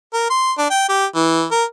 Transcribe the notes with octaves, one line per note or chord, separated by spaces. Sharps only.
A#4
C6
D4
G5
G4
E3
A#4